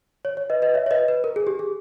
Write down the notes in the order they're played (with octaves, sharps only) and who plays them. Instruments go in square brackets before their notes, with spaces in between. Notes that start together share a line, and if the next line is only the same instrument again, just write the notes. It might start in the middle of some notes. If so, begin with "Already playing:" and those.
[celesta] C#5
C#5
B4 D#5
B4 D#5
C#5 E5
C#5
B4 D#5
B4
A#4
G#4
G4
G#4